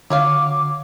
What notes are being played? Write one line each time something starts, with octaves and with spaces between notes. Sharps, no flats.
D3 F#3 C#5 F5 D6